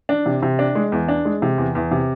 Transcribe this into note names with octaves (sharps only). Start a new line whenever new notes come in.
D4
C3
C3
D4
G#3
E2
D4
G#3
C3
E2
E2
C3